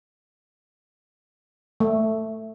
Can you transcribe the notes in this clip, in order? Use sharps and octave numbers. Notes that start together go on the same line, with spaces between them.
A3